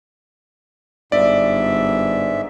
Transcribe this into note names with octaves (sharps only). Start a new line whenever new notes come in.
G1 G#2 D5 E5